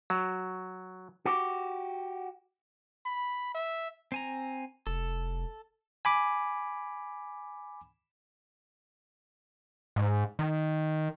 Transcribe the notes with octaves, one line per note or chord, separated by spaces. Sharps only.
F#3
F#4 G4
B5
E5
C4 G#5 A#5
F1 A4
G#5 B5 D6
G#2
D#3